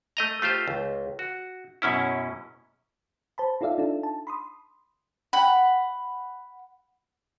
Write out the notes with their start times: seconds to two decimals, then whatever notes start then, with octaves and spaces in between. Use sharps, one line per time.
0.17 A3 D#5 A#5
0.42 A3 F4 G4 C5
0.68 C#2
1.19 F#4
1.82 F#2 B2 C#4 E4
3.38 C5 A5 B5
3.61 D#4 F4 A4 D5 E5 F5
3.78 D4 D#4 A4
4.03 A5
4.27 B5 C6 D#6
5.33 F#5 B5